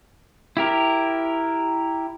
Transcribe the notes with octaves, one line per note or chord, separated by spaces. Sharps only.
E4 G4 A#4